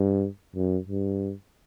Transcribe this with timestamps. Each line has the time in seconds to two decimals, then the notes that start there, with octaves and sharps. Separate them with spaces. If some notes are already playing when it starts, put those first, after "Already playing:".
Already playing: G2
0.56 F#2
0.87 G2